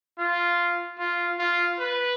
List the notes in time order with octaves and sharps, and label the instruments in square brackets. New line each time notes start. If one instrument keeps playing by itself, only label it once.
[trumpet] F4
F4
F4
B4